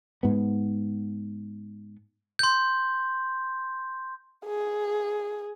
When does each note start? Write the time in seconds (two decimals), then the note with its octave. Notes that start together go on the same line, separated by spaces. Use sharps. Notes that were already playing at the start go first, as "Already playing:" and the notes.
0.23 G#2 B3
2.39 C6 G6
4.45 G#4